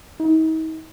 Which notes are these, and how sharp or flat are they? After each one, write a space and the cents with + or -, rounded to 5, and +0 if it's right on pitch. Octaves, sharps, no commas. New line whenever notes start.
D#4 +40